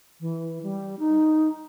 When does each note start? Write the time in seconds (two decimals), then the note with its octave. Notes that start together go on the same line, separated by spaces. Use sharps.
0.20 E3
0.63 G3
0.99 D#4